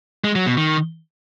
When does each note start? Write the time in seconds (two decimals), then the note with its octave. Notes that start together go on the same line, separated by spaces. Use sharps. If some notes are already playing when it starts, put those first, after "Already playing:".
0.24 G#3
0.35 F#3
0.46 B2
0.57 D#3